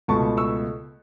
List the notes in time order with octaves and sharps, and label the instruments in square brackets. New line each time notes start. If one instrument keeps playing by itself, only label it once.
[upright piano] C#2 B2 A3 A5 C#6
C#6 E6